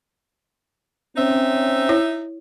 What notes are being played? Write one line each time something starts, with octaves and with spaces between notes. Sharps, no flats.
C4 C#4 D#4 E5
E4 C#5